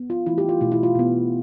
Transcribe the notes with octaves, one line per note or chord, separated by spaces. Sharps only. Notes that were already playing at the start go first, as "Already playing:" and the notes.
Already playing: B3
F4
E3 A3 E4
G4
F4
B2 A3 E4
E4
F4
B2 B3